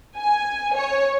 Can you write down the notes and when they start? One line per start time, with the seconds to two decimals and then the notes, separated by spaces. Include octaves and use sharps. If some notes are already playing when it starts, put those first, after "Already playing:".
0.16 G#5
0.75 C#5